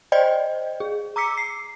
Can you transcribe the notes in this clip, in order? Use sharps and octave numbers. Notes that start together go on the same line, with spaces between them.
C5 D5 D#5 G5
G#4
A#5 D6 E6 B6 C#7
C7